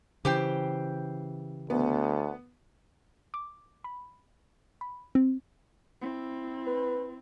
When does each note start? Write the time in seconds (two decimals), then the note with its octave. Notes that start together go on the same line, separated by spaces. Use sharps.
0.25 C#3 E3 G4 C5 G5
1.70 D2 B3
3.34 D6
3.84 B5
4.81 B5
5.15 C4
6.01 C4 E4
6.67 B4